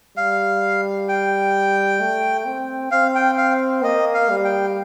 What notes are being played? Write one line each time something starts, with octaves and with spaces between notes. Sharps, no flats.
G3 F5
G5
A3
C4
C4 F5
G5
F5
A#3 D#5
F5
G3
G5